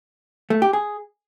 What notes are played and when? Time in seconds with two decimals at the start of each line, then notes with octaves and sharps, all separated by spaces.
0.50 A3
0.62 G4
0.73 G#4